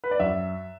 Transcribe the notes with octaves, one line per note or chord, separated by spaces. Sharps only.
B4
D5
F#2 E5